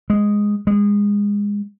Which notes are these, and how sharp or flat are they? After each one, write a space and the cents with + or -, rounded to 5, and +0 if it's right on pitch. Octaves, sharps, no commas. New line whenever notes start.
G#3 -5
G#3 -25